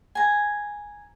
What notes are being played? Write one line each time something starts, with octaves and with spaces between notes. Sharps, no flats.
G#5 A#5